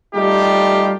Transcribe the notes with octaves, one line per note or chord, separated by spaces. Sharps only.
G3 A3 D#4 F4 G4